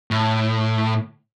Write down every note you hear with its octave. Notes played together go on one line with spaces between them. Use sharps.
A2